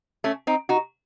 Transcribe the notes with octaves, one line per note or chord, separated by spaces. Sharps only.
A3 C#4
C4 D#4
D#4 F#4